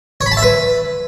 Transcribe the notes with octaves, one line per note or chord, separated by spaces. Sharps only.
C#5
B5
A5
E5
B4